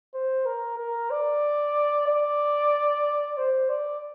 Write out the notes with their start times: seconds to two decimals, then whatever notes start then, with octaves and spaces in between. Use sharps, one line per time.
0.14 C5
0.46 A#4
0.79 A#4
1.11 D5
2.08 D5
3.37 C5
3.69 D5